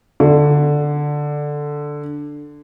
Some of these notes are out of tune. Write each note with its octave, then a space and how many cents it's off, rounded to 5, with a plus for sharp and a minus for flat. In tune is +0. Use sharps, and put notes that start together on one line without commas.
D3 +0 D5 +10